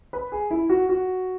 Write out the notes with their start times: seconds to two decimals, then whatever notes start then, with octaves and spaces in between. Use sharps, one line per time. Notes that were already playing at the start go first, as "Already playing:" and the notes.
0.13 B4
0.32 G#4
0.51 E4
0.69 F#4
0.89 F#4